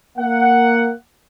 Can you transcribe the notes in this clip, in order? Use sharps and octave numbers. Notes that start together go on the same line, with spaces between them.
A#3 F#5